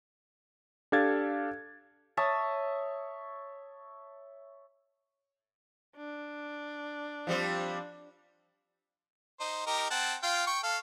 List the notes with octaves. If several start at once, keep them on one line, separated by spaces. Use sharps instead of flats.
D4 G4 A4 F5 G#6 A6
C#5 E5 A5 D#6
D4
F3 G3 C4
D#4 C5
D#4 G4 A#4
C4 F#5 A5
F4 F5 G5
G5 C#6
A4 F5